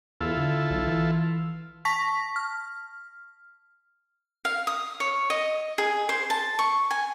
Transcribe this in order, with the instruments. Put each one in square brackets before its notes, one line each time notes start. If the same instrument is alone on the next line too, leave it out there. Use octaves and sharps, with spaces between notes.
[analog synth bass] E2 [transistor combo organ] E4 F4 A4
[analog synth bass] D3
B1
E3
[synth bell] A5 C#6 A#6 B6
F6
[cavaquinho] F5
D#6
C#5
D#5
G#4
C5
A5
C#6
G#5